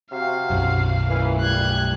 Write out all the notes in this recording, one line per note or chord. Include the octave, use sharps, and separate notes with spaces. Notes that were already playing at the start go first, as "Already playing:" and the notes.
C3 F#4 F5
B1 F#2
A#2 E3
G3 F#6 G#6